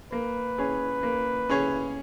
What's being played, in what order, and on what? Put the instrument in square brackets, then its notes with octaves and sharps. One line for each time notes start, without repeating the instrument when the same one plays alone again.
[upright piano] A#3 [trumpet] B4
[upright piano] C#4 G#4 C#5
A#3
C#4 G#4 C#5